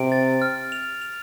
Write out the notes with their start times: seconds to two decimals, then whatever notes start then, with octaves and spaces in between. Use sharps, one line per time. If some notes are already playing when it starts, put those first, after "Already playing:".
Already playing: C3 D7
0.12 A6
0.42 F6
0.72 F7
1.02 F7